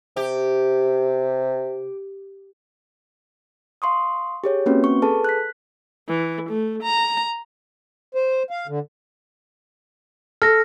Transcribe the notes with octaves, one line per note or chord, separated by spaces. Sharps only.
C3 G4
F5 C6 C#6 D#6
G4 G#4 C#5
A#3 C4 C#4 F#4 B4
C#6
G#4 A4 B4 A5
F#6 B6
E3
A3
A#5
C5
F5
D3
A4 F6 A#6